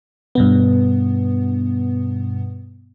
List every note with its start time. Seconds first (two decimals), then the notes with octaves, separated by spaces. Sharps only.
0.35 G2 B2 B3